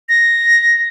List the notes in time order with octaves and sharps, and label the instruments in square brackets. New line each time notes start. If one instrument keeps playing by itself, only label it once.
[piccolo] A#6